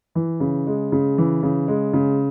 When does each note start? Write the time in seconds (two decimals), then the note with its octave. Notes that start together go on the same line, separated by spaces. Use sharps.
0.15 E3
0.40 C#3
0.67 G#3
0.92 C#3
1.18 E3
1.43 C#3
1.68 G#3
1.93 C#3